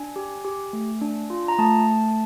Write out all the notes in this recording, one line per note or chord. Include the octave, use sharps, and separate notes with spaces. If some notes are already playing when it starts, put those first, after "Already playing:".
Already playing: D4 G#5
G4
G4
A3
D4
F4
A#5
A3 A5
A3